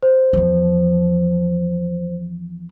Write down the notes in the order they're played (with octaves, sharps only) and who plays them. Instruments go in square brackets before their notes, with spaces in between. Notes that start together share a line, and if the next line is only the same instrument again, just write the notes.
[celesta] C5
[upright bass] E2 F3